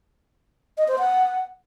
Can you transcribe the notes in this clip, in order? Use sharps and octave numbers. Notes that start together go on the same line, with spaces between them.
D#5
C5
F#5